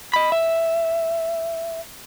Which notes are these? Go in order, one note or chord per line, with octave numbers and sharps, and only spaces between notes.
D#5 B5
E5